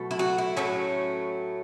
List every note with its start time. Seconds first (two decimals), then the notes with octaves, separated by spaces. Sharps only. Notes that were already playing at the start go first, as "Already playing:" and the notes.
Already playing: B2 F#3 A3
0.11 E4
0.19 F#4
0.38 E4
0.57 A2 F#3 A3 C#4